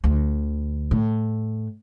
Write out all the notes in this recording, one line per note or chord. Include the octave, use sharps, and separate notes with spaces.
D2
A2